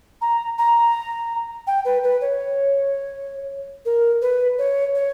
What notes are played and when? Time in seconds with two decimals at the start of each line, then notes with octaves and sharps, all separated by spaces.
0.22 A#5
0.58 A#5
1.67 G5
1.85 B4
2.04 B4
2.21 C#5
3.85 A#4
4.22 B4
4.58 C#5
4.95 C#5